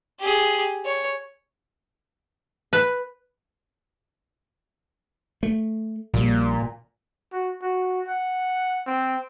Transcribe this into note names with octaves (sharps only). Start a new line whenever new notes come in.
G4 G#4
C#5
B4
A3
A#1 A#2 G3
F#4
F#4
F#5
C4